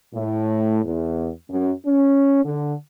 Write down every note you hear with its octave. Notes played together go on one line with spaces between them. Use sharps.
A2
E2
F#2
C#4
D3